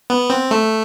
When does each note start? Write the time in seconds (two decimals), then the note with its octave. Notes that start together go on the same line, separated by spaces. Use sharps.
0.10 B3
0.30 C4
0.51 A3